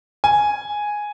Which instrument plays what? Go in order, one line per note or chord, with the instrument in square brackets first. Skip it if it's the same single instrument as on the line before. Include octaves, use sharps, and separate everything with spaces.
[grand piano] G#5